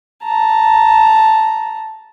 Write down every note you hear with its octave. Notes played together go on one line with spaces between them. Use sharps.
A5 A#5